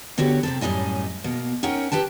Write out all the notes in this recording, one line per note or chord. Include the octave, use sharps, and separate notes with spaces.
D3 B3 F#4 G4 C#5
C3 C4 A4
F#2 A2 G3 D#5 G#5
B2 A#3
C#4 D#4 A#4 C#5 F#5 G5
G4 B4 G5 A5